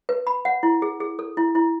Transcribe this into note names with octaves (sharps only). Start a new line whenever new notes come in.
B4
B5
F#5
E4
G#4
G#4
A4
E4
E4